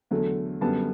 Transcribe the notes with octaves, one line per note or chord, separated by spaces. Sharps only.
E2 D3 F#3 A3
F#2 D3 G3 B3 A5